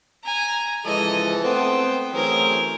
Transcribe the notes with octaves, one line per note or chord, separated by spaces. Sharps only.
G#5 A#5
C#3 E3 F3 G#3 A4 D#5
A3 B3 C4 C5 G5
E3 F#3 A3 C4 C#4 G#4 A#4